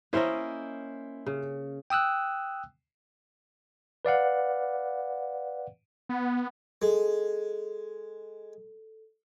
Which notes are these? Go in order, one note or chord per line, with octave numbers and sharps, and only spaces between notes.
A#3 C#4 E4 C5 D#5
C#3
G5 D#6 E6 F#6
B4 D5 F5 F#5
B3
G#3 A4